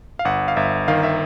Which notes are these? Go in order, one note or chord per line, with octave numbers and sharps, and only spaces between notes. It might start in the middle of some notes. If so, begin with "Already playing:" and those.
F5
G1 F#5
F5
G1 E5
D#3 F5
E5